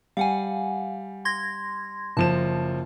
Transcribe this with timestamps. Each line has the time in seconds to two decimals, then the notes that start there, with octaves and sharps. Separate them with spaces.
0.17 G3 F5 F#5 G#5
1.25 C6 G#6 A#6
2.17 F#1 F3 A5 E7